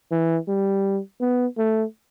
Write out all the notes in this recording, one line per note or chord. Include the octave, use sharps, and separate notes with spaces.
E3
G3
B3
A3